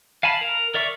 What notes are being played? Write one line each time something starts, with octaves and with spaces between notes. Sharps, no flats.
F5 G#5 A5 B5
A#4
A#4 D5 E5 C#6